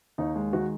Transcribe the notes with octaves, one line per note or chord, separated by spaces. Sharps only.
D#2 D#4
G#3
D#3 F#4